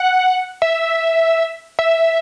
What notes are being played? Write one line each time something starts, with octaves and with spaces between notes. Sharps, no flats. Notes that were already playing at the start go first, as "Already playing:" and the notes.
Already playing: F#5
E5
E5